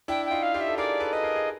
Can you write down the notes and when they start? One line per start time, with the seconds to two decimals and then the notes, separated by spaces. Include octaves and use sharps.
0.08 D4 E4 G5
0.25 G5
0.31 D#4 F4
0.43 F5
0.54 F4 G4
0.61 E5
0.68 A4
0.77 G#4 A#4 D5
1.00 A4 B4
1.13 B4 D#5
1.23 G#4 A#4
1.36 G#4